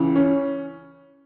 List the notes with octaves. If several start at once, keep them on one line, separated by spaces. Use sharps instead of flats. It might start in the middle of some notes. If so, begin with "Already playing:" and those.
Already playing: C#2 C#3 E3
C#4